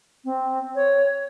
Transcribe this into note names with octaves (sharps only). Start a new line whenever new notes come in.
C4
C#5